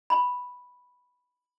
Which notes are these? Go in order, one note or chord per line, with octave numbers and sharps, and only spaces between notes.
B5